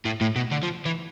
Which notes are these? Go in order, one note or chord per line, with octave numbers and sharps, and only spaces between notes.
A2
A2
B2
D3
F3
E3